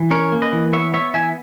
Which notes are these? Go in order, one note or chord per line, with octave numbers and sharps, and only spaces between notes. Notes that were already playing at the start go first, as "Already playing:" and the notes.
Already playing: E3
C#4 A#4 C#5
A#3
B4 D#5
E3
B3 C#5 E5
B3 C#5 E5
E3 E5 G#5